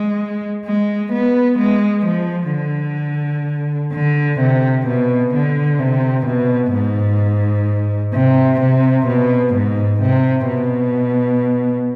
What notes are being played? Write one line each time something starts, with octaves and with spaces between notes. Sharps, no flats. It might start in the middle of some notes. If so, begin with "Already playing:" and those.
Already playing: G#3
G#3
B3
G#3
F3
D3
D3
C3
B2
D3
C3
B2
G#2
C3
C3
B2
G#2
C3
B2